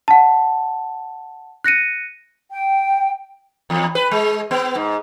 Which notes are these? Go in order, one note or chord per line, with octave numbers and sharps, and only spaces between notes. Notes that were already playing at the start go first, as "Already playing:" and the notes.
F#5 A5
F#6 A#6 C#7 D#7
G5
E2
B4
G#3
B3
G#2